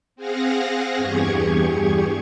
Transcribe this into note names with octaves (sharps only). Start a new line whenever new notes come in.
C4 G#4 F5 F#5 A#6
E2 G2 G4 G#4 C#6 G#6